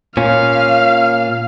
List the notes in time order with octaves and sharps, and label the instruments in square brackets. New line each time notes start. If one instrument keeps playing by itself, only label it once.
[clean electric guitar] A#2 C#4 [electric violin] F5